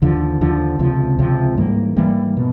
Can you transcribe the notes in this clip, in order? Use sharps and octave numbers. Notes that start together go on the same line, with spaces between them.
D#2 D3 F3
D#2 D3 F3
C#2 C3 F3
C#2 C3 F3
G#2 E3 G3 A#3
G#2 E3 G3 A#3
B2